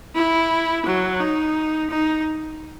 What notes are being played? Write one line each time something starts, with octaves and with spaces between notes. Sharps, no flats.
E4
F#3
D#4
D#4